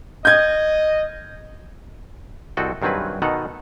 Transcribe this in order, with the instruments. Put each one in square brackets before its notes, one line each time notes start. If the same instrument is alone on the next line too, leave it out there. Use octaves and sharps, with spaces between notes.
[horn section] D#5 [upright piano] G6 G#6
[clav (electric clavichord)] C2 C4 F#4 A4 D#5
G2 D#3 F#3 C4 G#4 B4
B2 D#3 D#4 A4 F#5